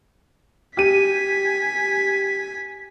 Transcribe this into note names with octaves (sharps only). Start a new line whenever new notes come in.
G4 G#5 B6 D#7